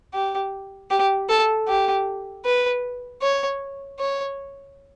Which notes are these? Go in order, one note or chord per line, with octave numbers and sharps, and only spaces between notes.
G4
G4
A4
G4
B4
C#5
C#5